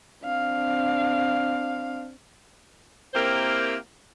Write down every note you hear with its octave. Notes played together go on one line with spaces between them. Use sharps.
C4 D4 F5
A#3 C4 E4 G4 A#4 C5